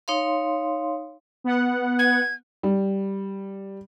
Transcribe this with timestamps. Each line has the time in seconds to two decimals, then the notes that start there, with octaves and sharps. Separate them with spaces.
0.08 D#4 C#5 F5 C6
1.44 B3 F#5
1.99 G#6
2.63 G3